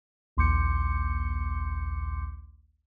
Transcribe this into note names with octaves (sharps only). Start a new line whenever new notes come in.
A#1 D#2 C6 D6 G6 C#7